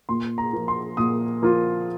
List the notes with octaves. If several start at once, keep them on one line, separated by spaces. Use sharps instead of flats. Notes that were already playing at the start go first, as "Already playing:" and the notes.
A#2 C6
A#5
F3 A#3 F4
C6
A#2 D#6
F3 A#3 F4